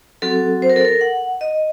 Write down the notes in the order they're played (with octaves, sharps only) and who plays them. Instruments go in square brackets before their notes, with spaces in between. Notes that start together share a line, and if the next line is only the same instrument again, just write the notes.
[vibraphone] F#3 C4 F#4 A4
C5
A#4
A4
A#4
F#5
D#5